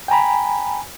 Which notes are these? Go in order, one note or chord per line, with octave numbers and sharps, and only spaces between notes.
G5 G#5 A#5 B5